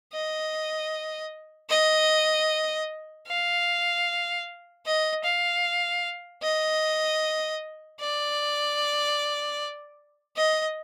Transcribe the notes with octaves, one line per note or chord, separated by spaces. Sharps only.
D#5
D#5
F5
D#5
F5
D#5
D5
D#5